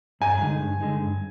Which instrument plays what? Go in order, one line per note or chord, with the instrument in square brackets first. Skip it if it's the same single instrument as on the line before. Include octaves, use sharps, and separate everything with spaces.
[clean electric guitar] G2 [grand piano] G#5
[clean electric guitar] D3 G#3 D#4
G2
D3 G#3 D#4
G2